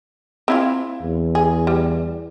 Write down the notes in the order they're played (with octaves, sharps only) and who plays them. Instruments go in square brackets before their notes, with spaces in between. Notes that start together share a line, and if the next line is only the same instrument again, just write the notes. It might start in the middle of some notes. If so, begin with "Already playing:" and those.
[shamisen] C4 E4 F4
[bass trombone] E2
[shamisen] G#4
G3